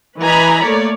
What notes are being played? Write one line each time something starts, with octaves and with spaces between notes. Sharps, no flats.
E3 B4 D#5 G#5 A#5 B5
A3 A#3 C#5 D5